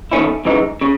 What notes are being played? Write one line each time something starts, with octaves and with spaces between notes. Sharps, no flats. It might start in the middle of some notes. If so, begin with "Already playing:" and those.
E2 D#3 A3 C#4 E4
F#2 C#3 E3 G#3 D#4
C#3